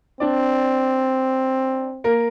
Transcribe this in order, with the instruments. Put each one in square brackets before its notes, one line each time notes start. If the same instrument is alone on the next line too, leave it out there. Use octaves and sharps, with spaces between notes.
[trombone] C4 [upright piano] D4 D5
[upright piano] A#3 A#4